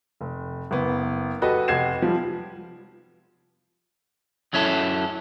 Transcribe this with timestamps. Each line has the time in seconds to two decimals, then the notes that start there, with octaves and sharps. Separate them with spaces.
0.21 F1
0.71 F#1 B3
1.42 F#4 G4 A4 B4 D#5
1.68 F1 G4 F#5 G#6 C7 E7
2.02 F3 G3
4.53 F#2 F#3 C#4 E4 A4